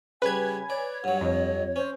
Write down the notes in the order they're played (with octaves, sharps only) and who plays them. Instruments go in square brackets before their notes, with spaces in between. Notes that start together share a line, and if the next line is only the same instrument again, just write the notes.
[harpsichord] C#3 G3 [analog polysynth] B4 G#6 [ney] G#5
[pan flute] C#5 [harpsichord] D5
[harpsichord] G2 F#3 [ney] F#5
[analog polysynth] F2 [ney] D#5
[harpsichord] C#4 [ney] C5